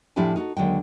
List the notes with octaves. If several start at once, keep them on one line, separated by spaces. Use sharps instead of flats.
A2 F3 D4 E4 G4 G#5
D#4 F#4 G#4 A4
D#2 D3 F#3 G#3 G5